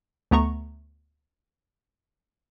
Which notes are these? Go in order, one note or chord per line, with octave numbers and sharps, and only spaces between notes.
D2 A3 B3 A#5 C#6